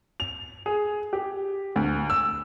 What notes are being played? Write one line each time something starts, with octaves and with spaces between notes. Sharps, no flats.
F7
G#4
G4
D2
E6